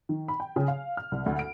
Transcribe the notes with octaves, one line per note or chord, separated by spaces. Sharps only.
D#3
B5
G5
C#3
F5
F6
C2
D2
D7